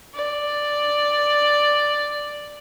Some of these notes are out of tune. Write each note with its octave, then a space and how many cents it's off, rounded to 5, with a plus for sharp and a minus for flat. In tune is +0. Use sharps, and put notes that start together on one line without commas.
D5 +5